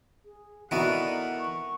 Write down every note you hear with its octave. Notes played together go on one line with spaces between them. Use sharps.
G#4
E3 B3 D#4 F#4 A4 A#4 D5 F#5
C#6